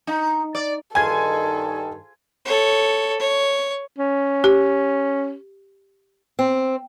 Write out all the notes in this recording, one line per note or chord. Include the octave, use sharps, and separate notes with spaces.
D#4
D5
G2 D#3 F4 G#4 A4 C5 G#5 G#6
A4 C#5
C#5
C#4
G4
C4